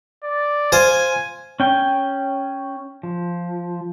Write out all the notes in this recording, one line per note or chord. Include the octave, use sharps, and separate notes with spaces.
D5
F4 C5 G#5
C#4 G5
F3